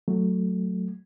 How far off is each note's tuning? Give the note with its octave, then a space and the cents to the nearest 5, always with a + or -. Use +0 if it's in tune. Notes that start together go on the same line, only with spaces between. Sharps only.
F#3 +0 A3 +5